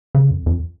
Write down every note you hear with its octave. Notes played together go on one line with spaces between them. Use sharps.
C#3
F2
F2